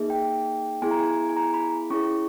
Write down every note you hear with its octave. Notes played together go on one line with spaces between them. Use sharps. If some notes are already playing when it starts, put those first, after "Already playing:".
Already playing: A#3 D#4 G#4
G5
B3 E4 G#4 G#5
A#5
G#5
G#5
A#5
B5
C#4 E4 G#4 C#6